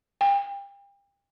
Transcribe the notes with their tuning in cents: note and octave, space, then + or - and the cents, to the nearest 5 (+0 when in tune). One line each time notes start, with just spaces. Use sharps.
G5 +35